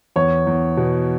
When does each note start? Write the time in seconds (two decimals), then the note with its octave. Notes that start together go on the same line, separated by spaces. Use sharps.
0.16 E2 C#5
0.47 E2
0.77 B2